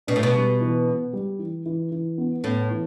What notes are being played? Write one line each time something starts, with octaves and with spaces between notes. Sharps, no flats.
B2 D4
A2
B2
G3
E3
B3
G3
E3
E3
E3
B3
A2 B3
E3